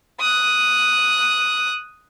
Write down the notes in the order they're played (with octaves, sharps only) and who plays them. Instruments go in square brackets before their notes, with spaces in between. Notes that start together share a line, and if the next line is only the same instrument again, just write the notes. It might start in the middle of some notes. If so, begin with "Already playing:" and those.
[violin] D#6 F#6